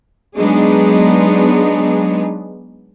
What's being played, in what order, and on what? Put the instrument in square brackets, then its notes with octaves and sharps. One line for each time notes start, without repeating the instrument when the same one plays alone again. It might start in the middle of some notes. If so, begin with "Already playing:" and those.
[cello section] F#3 G#3 B3 D4 D#4 G#4